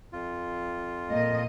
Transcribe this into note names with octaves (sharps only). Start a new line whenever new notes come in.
F2 F4
A#2 A#3 D#5